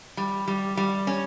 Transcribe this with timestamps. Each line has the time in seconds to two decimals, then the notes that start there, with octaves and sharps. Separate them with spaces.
0.17 G3
0.48 G3
0.77 G3
1.07 C#4